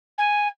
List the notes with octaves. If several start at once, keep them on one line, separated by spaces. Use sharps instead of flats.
G#5